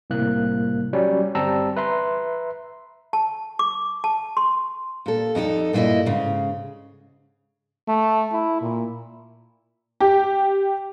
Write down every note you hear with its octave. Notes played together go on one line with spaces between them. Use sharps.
C2 A2 A#3 F#6
F#3 G3 C#4 C#5 D5
G1 G3 C4 A5 A#5 E6
B4 E5 A#5 C6
A5
D6
A5
C6
A#2 A4
F2 D#4 E4 A4
G2 A#2 A3 E4 D#5
G#2 C#3
A3
E4
A#2
G4